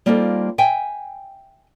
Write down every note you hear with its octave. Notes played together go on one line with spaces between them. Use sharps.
G3 A#3 C4 D#4 F4 A4
E5 G5 G#5